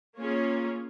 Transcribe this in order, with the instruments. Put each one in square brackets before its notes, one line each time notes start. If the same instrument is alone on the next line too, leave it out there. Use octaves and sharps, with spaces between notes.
[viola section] A#3 C#4 F4 G#4 C#5